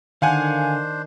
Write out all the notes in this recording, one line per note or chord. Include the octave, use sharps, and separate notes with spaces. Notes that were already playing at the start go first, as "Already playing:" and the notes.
D3 D#3 D4 C5 F5 F#5 G#5